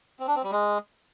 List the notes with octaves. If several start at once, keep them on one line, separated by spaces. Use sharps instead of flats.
C4
D4
C4
G3
G#3